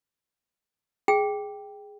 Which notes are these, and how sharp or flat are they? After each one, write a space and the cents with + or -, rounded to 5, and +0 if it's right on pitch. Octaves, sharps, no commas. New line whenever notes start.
G#4 +0 G5 +0